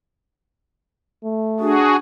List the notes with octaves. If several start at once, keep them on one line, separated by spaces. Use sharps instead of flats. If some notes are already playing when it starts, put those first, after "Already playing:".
A3
D4 F#4 G#4